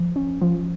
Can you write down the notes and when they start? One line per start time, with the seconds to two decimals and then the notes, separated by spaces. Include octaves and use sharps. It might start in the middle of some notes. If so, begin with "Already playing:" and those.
Already playing: F3
0.16 C#4
0.42 F3